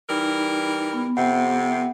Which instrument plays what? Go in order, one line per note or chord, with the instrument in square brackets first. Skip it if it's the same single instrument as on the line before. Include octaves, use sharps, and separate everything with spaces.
[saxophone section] E3 G3 A#4 [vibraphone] D#4
[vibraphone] B3
[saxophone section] F2 C3 [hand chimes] F#5